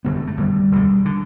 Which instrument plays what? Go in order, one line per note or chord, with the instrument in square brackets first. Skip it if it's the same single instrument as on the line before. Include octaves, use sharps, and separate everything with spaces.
[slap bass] G1 F#2 D3 B3
A3
A3
G1 F#2 D3 G3
E1 D2 D3
D3